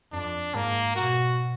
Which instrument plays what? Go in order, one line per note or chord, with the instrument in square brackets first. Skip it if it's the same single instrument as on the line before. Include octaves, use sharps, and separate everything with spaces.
[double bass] F2 [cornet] D4
[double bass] G#2 [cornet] A#3
[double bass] B2 [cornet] F#4